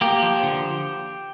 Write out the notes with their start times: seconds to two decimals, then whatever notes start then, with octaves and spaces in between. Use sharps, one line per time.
0.01 A#3 G4
0.22 F3
0.43 D3